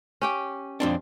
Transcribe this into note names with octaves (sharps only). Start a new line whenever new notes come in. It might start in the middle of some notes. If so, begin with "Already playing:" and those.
C#4 G4 G5
F2 C4 D4